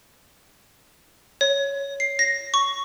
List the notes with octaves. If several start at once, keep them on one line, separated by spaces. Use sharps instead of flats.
C#5
C7
A#6
C#6